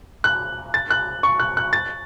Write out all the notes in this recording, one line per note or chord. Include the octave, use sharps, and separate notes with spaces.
F#6
A6
F#6
C#6
F#6
F#6
A6